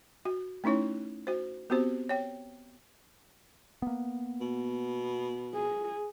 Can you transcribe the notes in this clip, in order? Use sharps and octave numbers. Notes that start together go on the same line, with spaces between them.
F#4
A3 C#4 D#4 E4 C#5
F#4 C5
B3 C4 F#4 G4 C5
C#5 G5
A#3 B3
B2
G#4